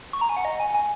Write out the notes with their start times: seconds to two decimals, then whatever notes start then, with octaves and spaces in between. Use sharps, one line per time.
0.13 C#6
0.21 A#5
0.29 G#5
0.37 F#5
0.45 D#5
0.60 G#5
0.74 G#5